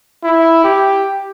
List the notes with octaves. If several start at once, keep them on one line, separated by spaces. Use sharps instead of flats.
E4
G4